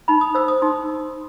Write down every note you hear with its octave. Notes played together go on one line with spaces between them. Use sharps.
D#4 B5
D#6
C5 E6
D#6
D#4 C6